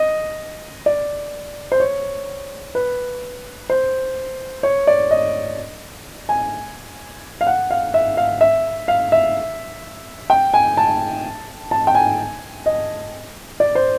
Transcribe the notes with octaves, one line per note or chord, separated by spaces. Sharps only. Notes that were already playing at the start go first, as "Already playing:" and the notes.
Already playing: D#5
D5
C5
C#5
B4
C5
C#5
D5
D#5
G#5
F5
F#5
F5
E5
F5
E5
F5
E5
G5
G#5
A5
A5
G5
G#5
D#5
D5
C5